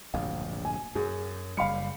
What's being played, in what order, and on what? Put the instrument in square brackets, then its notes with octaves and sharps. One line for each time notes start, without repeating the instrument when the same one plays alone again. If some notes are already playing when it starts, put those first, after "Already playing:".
[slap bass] D1 A#1 G2 [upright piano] F5
[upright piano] G#5
[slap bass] F#2 [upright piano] G#4
[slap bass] F#1 G3 [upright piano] F5 B5 C#7